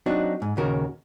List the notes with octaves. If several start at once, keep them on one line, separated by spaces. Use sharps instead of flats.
F#3 C4 D4 D#4 F#4
G#2
D#2 A#2 C#3 F#4 A#4